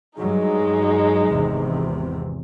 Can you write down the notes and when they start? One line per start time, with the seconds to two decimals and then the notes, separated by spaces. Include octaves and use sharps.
0.19 G2 F#3 G#3 D#4
1.28 G#1 E2 C3